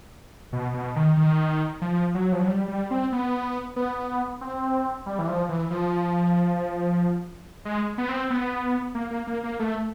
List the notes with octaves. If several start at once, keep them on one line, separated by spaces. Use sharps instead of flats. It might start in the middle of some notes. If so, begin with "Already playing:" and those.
B2
B2
D#3
D#3
F3
F#3
F3
F#3
G3
G3
C4
B3
B3
C4
G3
E3
F3
E3
F3
G#3
B3
C4
B3
A#3
A#3
A#3
A#3
A3